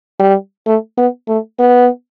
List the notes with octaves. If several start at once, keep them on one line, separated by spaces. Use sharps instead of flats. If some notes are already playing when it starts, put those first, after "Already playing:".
G3
A3
B3
A3
B3